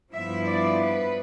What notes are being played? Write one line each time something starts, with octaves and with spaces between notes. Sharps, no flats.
G2 F3 B3 E4 E5
D5
B4